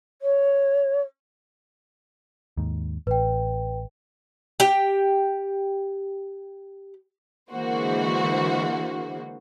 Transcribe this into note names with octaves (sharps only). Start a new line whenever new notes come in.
C#5
D#2 G#2
A1 B4 G5
G4 G5
D3 E3 G#3 A#3 F#4 C5